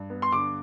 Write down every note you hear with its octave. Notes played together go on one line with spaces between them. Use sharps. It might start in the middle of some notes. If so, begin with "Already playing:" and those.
Already playing: G2
B3
C6
D3 D6